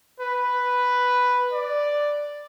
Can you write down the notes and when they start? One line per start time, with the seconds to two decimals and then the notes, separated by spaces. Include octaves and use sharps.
0.20 B4
1.53 D5